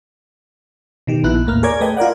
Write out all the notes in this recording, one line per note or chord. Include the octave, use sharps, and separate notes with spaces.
B2 D#3 G4
A#1 B3 E4 F#6
D#2 A2 A#3 F6
G#4 A#4 C#5 D5 G#6
A3 A4 B4 D#5 G5
F4 A#4 D5 F#5